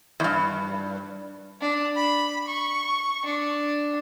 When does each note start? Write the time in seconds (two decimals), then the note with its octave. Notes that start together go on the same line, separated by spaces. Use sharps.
0.20 E2 G2
1.61 D4
1.96 B5
2.48 C#6
3.25 D4